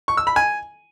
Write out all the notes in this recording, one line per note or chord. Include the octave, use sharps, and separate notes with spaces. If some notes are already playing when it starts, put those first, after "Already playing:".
C#6
E6
B5
G#5